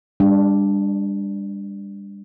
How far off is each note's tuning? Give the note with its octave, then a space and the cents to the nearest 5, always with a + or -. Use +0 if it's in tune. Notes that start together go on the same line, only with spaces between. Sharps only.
G3 +35 D4 +0